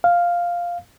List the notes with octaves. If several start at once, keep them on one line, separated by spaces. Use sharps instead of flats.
F5